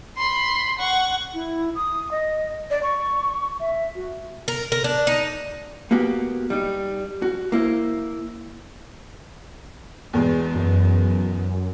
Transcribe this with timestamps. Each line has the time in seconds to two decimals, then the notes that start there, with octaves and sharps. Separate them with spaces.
0.17 B5 C6
0.78 F#5 C#6
1.34 E4
1.75 D#6
2.11 D#5
2.71 D5
2.83 C#6
3.60 E5
3.95 F#4
4.48 A#4
4.72 A#4
4.84 D4
5.07 D#4
5.91 A#3 B3 F#4 G4
6.50 G3 D#4
7.22 F#4
7.52 A#3 E4 C5
10.13 E2 B2 G#3
10.55 F#2